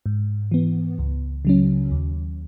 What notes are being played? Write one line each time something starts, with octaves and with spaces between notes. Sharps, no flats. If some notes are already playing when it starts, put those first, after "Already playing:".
G#2
E3 B3
C#2
C#3 F#3 C#4
D#2